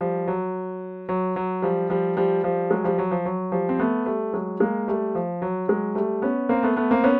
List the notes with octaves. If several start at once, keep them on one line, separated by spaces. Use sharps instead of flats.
F3 G3
F#3
F#3
F#3
F3 G3
F3 G3
F3 G3
F3 G3
F#3 G#3
F3 G3
F#3
F3
F#3
F3 G3
C4
A3 B3
G3 A3
F#3 G#3
G#3 A#3
G3 A3
F3
F#3
F#3 G#3
G3 A3
B3 C#4
A#3 C4
A3 B3
A3 B3
A#3 C4
B3 C#4